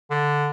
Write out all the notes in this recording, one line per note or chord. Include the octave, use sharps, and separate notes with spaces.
D3